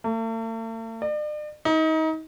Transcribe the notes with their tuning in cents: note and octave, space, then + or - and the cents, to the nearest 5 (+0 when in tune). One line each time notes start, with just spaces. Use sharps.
A3 +45
D5 +40
D#4 +30